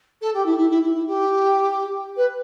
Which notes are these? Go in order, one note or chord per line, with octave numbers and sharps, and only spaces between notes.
A4
G4
E4
E4
E4
E4
E4
G4
B4